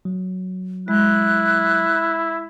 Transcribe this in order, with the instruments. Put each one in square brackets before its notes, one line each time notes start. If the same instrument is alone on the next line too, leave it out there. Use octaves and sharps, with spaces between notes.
[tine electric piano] F#3
[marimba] G#3 [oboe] E4 [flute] F#6